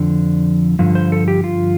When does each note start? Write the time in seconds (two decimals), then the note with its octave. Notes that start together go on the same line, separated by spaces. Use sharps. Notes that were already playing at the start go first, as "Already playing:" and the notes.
Already playing: F2 D3 F3 D5
0.79 G2 D3 F3
0.95 C5
1.12 A4
1.28 G4
1.44 F4